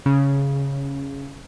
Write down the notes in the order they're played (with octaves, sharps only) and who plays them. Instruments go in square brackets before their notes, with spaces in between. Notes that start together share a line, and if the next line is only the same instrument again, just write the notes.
[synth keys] C#3